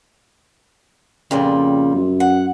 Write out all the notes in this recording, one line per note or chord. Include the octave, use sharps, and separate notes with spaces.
F2 A#2 C#3 G3
F#2
F#5